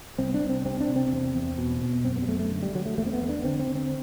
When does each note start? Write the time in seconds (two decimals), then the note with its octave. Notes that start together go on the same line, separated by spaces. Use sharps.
0.18 C2 C4
0.34 D4
0.42 C2
0.49 C4
0.65 C3 C4
0.81 D4
0.88 C3
0.96 C4
1.11 E2
1.34 E2
1.58 B2
1.81 B2
2.04 F#2 C4
2.16 B3
2.22 G3
2.28 F#2 A3
2.39 A3
2.51 D3
2.63 G3
2.74 D3 F#3
2.86 A3
2.98 E2 A3
3.06 C4
3.13 B3
3.21 E2
3.29 D4
3.44 D3 C4
3.59 C4
3.68 D3
3.75 C4